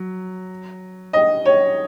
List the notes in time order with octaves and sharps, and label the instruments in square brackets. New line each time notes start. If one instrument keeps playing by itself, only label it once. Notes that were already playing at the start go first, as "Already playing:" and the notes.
Already playing: [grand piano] F#3
[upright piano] D#5
C#5